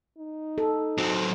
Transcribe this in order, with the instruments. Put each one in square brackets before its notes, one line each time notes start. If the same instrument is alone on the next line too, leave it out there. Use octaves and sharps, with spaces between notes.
[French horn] D#4
[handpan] A4
[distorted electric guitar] F#3 C4